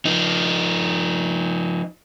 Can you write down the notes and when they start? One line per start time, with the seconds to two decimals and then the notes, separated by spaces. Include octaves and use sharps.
0.05 F3 D#4